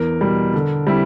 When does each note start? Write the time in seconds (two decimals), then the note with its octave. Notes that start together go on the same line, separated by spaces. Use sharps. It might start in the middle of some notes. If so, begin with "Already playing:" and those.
Already playing: E2 A#4
0.21 B2 G3
0.54 D3
0.87 G3 C4 E4